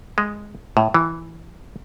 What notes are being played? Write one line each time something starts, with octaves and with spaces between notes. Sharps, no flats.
G#3
A2
E3